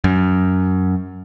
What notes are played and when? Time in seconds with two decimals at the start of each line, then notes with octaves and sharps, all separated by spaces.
0.04 F#2